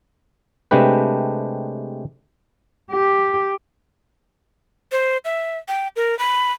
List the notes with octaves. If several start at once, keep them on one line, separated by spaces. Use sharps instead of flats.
C3 G#3 A3 D4 G4 B4
G4
C5
E5
G5
A#4
B5